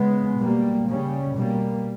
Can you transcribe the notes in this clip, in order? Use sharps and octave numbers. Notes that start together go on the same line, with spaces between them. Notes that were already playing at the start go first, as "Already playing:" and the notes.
Already playing: C#3 G#3 B3
B2 G3 A#3
C#3 G3 C#4
B2 G3 A#3